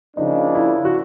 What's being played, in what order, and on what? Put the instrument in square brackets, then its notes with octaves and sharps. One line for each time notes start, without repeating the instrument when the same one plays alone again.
[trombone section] C#3 F3 A#3 D4 [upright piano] D#4
[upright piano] E4
F#4